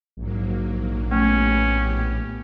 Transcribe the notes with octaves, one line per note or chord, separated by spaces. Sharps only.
A#1 G#2 F#3 A#3
A2 A3 B3 C#4 G4